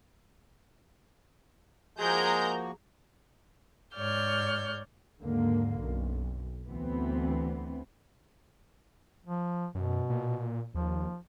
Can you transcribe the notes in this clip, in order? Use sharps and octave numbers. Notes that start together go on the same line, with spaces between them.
F3 G#3 A#3 F#4 G#4 A#4 A#5 G6
G#2 C#5 D5 F6 G6
D#2 G#2 D3 A#3
B1 F#2
D2 E3 B3 C4
F3
F#2 B2
A#2
D#2 F3